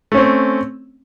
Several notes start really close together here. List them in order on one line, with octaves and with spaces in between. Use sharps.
A3 C#4 C4